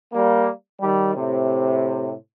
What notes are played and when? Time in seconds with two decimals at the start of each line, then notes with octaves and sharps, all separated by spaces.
0.12 G3 A#3
0.80 D#3 G3
1.14 A2 C3